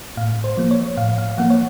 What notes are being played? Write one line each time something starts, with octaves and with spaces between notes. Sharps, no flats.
A2 F5
C5
F3 A#3
C#5
A2 F5
F5
F3 A#3 F#5
C#5